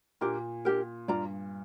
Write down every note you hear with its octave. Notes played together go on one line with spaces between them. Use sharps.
A#2 D4 G4 A#4
D4 G4 A#4
G2 F4 D5 A#5